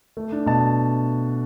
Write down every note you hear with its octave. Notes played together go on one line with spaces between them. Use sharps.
A3
D4
B2 A5